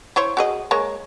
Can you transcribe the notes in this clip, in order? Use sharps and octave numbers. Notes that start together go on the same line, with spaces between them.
E4 C5 C#5
F#4 G#4 D#5
G#3 A#3 C#5